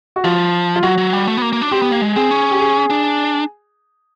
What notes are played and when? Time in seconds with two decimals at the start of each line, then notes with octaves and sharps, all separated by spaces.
0.16 F#4
0.24 F3 F4
0.76 F4
0.83 F#3 F#4
0.98 F#3
1.13 G3
1.27 A3
1.37 B3
1.42 A#3
1.53 A#3
1.62 D4
1.71 C4 G4
1.82 B3
1.91 A#3
2.02 G#3
2.16 C4 G#4
2.31 C#4
2.51 G4
2.60 G#4
2.90 D4